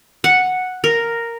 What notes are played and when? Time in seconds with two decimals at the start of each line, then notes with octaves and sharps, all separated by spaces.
0.24 F#5
0.84 A#4